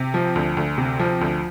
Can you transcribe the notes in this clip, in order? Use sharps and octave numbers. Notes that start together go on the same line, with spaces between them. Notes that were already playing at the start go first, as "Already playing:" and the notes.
Already playing: C3
F3
D2
D2
C3
F3
D2